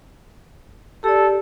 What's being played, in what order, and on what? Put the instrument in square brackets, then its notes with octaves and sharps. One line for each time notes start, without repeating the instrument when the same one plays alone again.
[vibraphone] G4 D5 [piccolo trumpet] A4